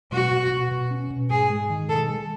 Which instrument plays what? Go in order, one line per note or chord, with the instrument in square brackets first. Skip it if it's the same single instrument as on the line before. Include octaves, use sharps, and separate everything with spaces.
[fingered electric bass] B2 [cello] F#4
[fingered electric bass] B2
B2
B2
C#4
B2
[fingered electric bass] G#2 [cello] G#4
[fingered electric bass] G#3
D#3
[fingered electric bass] B2 [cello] A4
[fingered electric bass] G#3